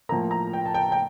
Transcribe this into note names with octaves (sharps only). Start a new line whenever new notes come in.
A2 F3 A#3 A#5
A#5
G5
A5
G5
G5